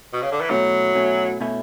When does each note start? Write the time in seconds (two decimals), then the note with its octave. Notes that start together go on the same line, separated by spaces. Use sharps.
0.13 B2
0.23 C#3
0.32 D3
0.41 E3
0.50 B2 F#3 A3 C#4 E4
0.95 B2 A3 C#4 E4
1.41 B2 A3 C#4 E4